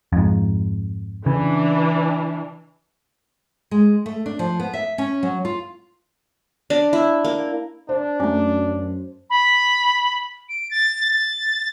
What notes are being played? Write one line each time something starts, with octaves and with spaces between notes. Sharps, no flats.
F2 G#2
C#3 E3 D4
G#3
A3
D4
F3
B3
E5
C#4
F#3
F4
D4
E4
A#3
D4 C5
F#2 A3 C#4
B5
D7
A6
A6